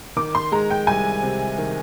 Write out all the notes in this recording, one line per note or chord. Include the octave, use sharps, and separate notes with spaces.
D#3 D6
C6
G#3 A#5
G5
C2 G#5
C3
D#3